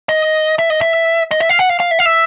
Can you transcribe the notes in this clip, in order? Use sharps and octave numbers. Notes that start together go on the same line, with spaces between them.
D#5
E5
D#5
E5
D#5
E5
F5
F#5
F5
F5
E5
F5
E5